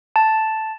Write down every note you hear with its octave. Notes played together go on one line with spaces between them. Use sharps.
A5